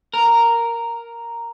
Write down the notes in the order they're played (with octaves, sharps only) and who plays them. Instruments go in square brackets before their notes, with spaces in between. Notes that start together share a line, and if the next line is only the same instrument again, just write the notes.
[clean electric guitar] A#4